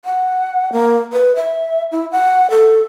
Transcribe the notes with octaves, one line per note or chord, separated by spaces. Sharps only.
F#5
A#3
B4
E5
E4
F#5
A4